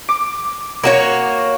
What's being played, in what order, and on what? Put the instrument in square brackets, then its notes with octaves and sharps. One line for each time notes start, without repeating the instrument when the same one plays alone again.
[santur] D6
[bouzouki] A#3 F#4 C#5